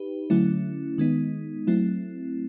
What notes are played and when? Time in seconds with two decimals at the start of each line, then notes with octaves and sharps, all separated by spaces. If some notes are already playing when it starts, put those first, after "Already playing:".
Already playing: D#4 G4 B4
0.30 D3 F#3 A3 C#4 E4
0.98 D#3 G#3 B3 D#4
1.67 F#3 A3 C4 E4